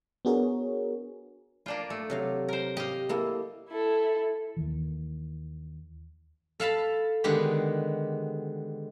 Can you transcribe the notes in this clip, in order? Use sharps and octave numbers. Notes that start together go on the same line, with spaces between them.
B3 D4 F#4 G#4 A#4 C#5
A#3 D4 F4
A3
C3 F#3 F5
A#4 C5
G4 D#5 F5
A#3 E4 A4
E4 A4
D#2 D#3 E3
A4 F5 A5 B5
D3 D#3 G#3 B3 G4